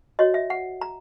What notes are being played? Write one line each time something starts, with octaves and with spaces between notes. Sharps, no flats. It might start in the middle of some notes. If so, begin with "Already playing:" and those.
F#4 C#5 D#5
E5
F#5
A#5